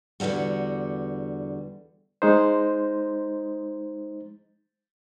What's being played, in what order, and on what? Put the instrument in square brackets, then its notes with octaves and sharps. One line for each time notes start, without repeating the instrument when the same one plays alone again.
[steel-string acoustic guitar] E2 G#2 D3 G3 F#4
[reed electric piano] G#3 D#4 C5